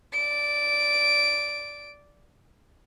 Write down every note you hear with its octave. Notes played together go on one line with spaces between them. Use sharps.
D5 D7